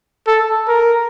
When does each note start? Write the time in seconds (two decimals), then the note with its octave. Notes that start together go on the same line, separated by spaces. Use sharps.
0.27 A4
0.68 A#4